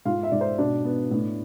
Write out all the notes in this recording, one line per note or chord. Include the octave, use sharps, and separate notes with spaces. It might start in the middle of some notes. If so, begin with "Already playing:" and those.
G#2 F4 F5
E5
G#2 D5
C5
B2 D4 D5
B3
A2